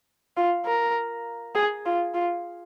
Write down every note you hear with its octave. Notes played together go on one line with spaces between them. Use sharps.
F4
A#4
G#4
F4
F4